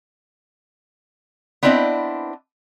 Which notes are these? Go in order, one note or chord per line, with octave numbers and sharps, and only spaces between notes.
B3 C4 D4 E4 D5 D#5